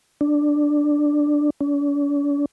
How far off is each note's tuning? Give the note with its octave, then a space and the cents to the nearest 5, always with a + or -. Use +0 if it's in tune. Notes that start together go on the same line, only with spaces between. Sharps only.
D4 +5
D4 -45